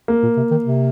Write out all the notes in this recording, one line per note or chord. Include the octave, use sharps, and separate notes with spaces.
A#3
A#2
C3
D#3
C3